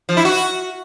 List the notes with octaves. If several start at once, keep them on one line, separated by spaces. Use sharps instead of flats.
F3
E4
F#4